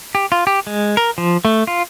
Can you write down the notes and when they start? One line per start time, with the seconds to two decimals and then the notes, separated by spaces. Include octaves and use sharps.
0.15 G4
0.32 F4
0.47 G4
0.67 G#3
0.97 A#4
1.18 F3
1.45 A3
1.67 F4